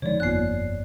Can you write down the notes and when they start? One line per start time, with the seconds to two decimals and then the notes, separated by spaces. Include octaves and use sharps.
0.02 D3 F3 G#3 D#4 C#5 D5
0.20 G1 F2 A#3 B3 F4 F#6 C7